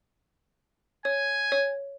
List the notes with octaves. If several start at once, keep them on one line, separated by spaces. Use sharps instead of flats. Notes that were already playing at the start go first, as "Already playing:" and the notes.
C#5 G#5
C#5